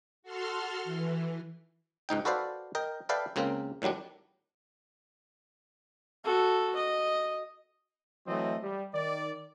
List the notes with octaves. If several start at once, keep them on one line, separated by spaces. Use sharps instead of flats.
F#4 A4 C6 F6
E3
C#2 G#2 D#4 G5
F#4 A4 B4 C5 D5 F5
A#4 D#5 G5
A4 B4 D5 E5 F5 G5
C#2 C#3 A#3 C4 A#4
A2 D#3 F#3 G3 D4
F#4 A4
D#5
E3 F#3 A3 C4 D#5
G3
D#3 D5